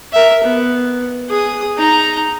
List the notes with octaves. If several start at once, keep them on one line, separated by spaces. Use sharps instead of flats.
A#4 E5
B3
G#4 D#6
D#4 A#5